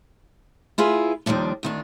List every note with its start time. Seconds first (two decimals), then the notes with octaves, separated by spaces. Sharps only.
0.78 E4 F4 G#4 B4
1.26 D#2 D#3 F3 G3 D4
1.63 D2 D#3 D4